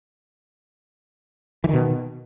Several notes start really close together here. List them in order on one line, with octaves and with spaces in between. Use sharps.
E3 D#3 B2